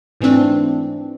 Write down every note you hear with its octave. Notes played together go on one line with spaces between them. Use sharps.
G#2 E3 A3 C4 D4